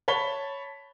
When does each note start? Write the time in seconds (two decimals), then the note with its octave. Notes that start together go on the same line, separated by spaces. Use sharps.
0.08 C#5 A5 B5 B6 G7